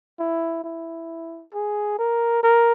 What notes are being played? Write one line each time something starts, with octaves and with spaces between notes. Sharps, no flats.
E4
E4
G#4
A#4
A#4